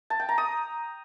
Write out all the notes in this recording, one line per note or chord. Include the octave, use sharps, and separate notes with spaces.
A5
G5
A#5
D#6